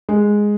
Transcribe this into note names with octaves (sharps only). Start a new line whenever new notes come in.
G#3